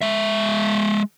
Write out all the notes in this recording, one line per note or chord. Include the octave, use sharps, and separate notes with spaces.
G#3 E5